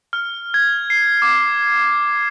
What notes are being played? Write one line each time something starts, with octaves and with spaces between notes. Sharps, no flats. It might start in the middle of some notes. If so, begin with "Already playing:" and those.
F6
G#6
C7
D6